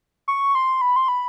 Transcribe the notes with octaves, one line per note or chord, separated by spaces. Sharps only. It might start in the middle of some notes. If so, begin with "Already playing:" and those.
C#6
C6
B5
C6
B5